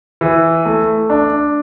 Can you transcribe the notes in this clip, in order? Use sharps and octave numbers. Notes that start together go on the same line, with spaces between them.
E3
A3
D4